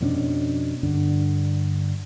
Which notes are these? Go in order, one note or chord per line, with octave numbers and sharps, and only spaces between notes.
F2 B2 C#4 D4
G2 D3 D4